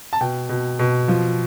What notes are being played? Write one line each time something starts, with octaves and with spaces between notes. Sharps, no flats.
A5
B2 G5
B2
B2
F3